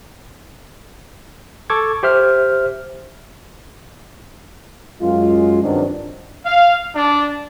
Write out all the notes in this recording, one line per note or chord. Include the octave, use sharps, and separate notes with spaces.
A4 C#6 D6 G#6
G4 C5 E5 F6
F#2 G#3 F4
G2 D#3 F#3 C4 D4
F5
D4